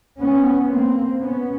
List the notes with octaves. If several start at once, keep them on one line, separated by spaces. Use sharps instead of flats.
B3 C#4
A#3 C4
B3 C#4